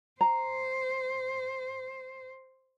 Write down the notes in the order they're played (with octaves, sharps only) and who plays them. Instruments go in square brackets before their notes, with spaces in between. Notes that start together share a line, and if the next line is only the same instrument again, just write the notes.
[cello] C5 [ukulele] A#5